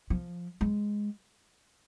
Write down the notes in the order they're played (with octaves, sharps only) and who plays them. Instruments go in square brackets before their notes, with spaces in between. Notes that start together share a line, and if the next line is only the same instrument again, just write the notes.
[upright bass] F3
G#3